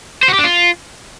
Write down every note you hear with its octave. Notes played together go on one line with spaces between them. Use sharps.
C5
F#4
G4
D4
F4